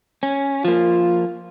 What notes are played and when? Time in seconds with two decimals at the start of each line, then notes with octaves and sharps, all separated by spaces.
0.23 C#4
0.65 F3 A#3 F4